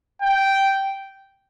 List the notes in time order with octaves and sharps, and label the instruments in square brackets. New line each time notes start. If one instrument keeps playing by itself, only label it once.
[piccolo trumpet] G5